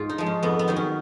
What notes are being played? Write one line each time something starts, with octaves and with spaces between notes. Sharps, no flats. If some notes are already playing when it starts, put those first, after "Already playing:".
Already playing: G#2 F4 G#4
D#4
F3 G#3
C#4
F2 B3
B3
D#3 F#3 D#4
C#4